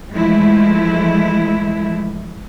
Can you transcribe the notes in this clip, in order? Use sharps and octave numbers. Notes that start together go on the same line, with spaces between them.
E3 F3 G#3 A3 E4